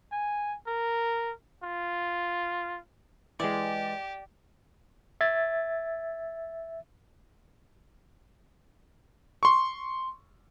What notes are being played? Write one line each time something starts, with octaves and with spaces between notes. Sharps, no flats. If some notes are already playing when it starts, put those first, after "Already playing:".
G#5
A#4
F4
E3 G#3 G4 D5
E5 G#6 A6
C6 C#6